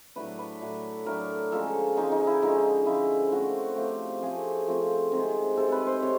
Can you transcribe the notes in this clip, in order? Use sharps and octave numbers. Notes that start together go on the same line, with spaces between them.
A2 F#3 A3 D4 B4
B4
A2 F#3 A3 D4
A2 F#3 A3 D4 A#4
D3 F3 G#3 C#4 A4
D3 F3 G#3 C#4 D#4
D#4
E4
D3 F3 G#3 C#4 D#4
D3 F3 G#3 C#4 E4
F3 A3 C4 F#4
F3 A3 C4 G4
F3 A3 C4 G#4
F3 A3 C4
C3 D#3 G#3 C4
C3 D#3 G#3 C4 A4
B4
C5
C3 D#3 C#5